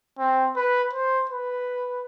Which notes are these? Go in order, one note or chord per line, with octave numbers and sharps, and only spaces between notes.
C4
B4
C5
B4